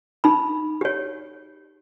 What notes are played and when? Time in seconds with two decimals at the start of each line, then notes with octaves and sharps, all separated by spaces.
0.24 D#4 B5
0.81 G4 C#5